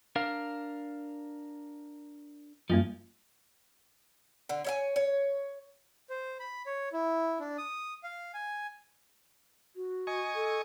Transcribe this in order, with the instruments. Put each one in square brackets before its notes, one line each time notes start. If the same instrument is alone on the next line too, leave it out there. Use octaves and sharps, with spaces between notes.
[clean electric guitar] D4 A#4 F5
[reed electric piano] F#2 [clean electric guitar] F3 D#4 [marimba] G3 A#3 F4
[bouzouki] D3
C#5 E5 G#5
C#5
[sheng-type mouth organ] C5
B5
C#5
E4
D4
D#6
F5
G#5
[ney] F#4
[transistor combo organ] D#5 G#5 C#6
[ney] A4